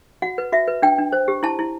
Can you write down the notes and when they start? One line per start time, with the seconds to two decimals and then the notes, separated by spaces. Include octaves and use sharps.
0.22 F#4 F#5
0.38 B4
0.52 F#4 E5
0.68 B4
0.82 D4 G5
0.98 D4
1.12 C5
1.28 G4
1.43 E4 A5
1.59 E4